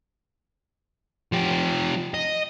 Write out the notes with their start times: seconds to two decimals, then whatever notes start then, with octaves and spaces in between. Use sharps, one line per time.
1.32 F3 G4
2.14 D#5